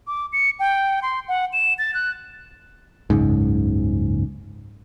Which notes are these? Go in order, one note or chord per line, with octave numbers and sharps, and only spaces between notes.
D6
C#7
G5
C6
F#5
E7
A6
F#6
F#1 C#2 G#2